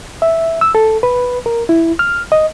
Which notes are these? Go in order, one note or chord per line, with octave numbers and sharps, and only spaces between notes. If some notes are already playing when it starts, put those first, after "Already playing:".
E5
E6
A4
B4
A#4
E4
F6
D#5